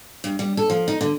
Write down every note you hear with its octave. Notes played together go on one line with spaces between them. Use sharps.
G2
G3
A4
F3
D#4
D3